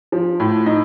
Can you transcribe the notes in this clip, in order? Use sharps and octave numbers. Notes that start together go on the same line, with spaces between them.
F3
A2
D#4